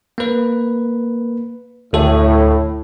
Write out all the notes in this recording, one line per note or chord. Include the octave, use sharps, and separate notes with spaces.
A#3 B4
D2 A2 A4